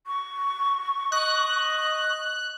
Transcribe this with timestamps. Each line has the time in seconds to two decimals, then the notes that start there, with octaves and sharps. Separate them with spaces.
0.07 C#6
1.12 D#5 F#6